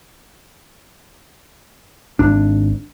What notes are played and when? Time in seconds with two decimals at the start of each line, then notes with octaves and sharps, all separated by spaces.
2.19 G#1 D4